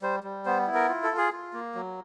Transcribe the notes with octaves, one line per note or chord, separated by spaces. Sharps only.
G3 C5
G3
B3 C5
E4
A#4
F4
A4
F4
G#4
F4
A#3
F#3